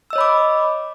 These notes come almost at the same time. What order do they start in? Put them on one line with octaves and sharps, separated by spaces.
E6 D#5 C#5 B5 D6